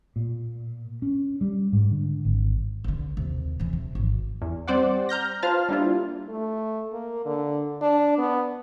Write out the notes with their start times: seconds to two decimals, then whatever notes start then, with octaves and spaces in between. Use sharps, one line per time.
0.16 A#2
1.02 C#4
1.41 G3
1.73 G#2
1.91 D3
2.25 G#1
2.84 C2 D3
3.17 D#2 C3
3.60 C3 E3
3.73 C3
3.95 G#1
4.42 E2
4.68 G3 C4 C5 D5 F#5
5.09 A#5 F6 G6 A#6
5.42 F4 B4 C5 F5 A5 F6
5.69 G3 A#3 D4 E4 F4
6.29 A3
6.93 A#3
7.25 D3
7.81 D4
8.18 B3